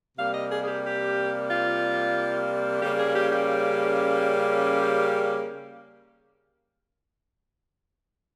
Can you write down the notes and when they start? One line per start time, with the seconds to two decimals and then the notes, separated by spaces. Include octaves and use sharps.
0.17 C3 G3 A#3 F5
0.33 D#5
0.50 G#4
0.62 G#4
0.67 G4
0.83 G4
1.50 F4
2.81 C#3 G3 A#3 C#4 G4
2.98 G#4
3.15 G4
3.30 G4
3.47 G4
4.79 G4